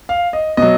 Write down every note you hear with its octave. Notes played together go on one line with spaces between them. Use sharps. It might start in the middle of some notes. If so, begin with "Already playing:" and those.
F5
D#5
B2 F#3 D#5